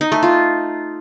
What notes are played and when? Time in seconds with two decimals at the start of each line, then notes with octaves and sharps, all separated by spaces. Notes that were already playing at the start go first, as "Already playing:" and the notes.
0.01 D#4
0.12 A3
0.23 F4